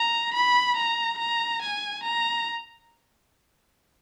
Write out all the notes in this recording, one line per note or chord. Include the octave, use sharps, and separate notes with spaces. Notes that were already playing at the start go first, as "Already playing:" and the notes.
Already playing: A#5
B5
A#5
A#5
G#5
A#5